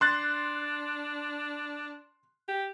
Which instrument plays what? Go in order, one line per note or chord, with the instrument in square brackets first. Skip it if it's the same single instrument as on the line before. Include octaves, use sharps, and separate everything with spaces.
[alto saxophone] D4 [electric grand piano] C6 F#6 A6
[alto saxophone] G4